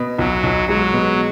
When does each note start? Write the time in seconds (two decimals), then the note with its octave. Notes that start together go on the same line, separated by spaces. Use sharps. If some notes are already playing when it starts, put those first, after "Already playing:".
Already playing: B2
0.19 B1 F#3
0.43 B1
0.69 F#3 G#3
0.93 B2